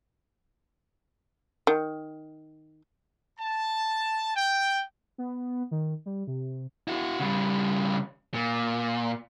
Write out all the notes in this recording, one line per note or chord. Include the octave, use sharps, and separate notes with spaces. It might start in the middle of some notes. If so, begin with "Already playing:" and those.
D#3
A5
G5
B3
D#3
G3
C3
E4 F#4
C#3 G3
A#2